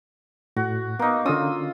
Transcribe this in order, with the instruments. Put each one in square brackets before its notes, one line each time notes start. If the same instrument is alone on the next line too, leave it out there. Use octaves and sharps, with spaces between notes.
[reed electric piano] A2 [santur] F#4
[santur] A#3 D#4 [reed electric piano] B3
[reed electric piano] D3 C#4 [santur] F4 D#6 E6